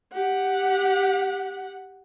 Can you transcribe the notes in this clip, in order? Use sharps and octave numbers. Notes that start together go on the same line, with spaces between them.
G4 F#5